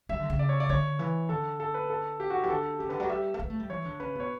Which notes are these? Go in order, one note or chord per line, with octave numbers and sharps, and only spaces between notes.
F#3 E5
D3
C#3
D5
C#5
D5
D3 C#5
E3
D3 A4
A4
B4
A4
G4
F#4
E3 G4
D3 A4
C#3 G4
D3 B4
F#3 D5
G3 E5
A3
B3
A3
G3
E3 C#5
D3
C#3 B4
B2 C#5